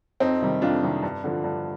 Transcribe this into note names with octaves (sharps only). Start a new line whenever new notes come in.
F2 C4 D#4
C3 D#3 G3
F2 D4 F4
C3 D#3 G3
G2
D3 F3
G2